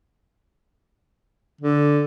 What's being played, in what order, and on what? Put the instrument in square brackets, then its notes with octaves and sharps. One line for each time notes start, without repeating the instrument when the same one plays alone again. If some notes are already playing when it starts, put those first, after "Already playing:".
[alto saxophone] D3